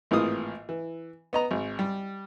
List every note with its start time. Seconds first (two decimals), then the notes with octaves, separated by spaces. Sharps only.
0.11 G#1 A2 E3 A#3 F4 D#6
0.69 E3
1.33 B3 D#5 A#5
1.51 G#1
1.79 G3